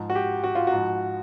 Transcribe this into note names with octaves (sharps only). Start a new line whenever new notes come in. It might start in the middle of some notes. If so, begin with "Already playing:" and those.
Already playing: G#2 F3
F#4
G4
F#4
F4
F#4
G#2 F3